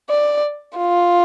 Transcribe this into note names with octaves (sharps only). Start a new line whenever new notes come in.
D5
F4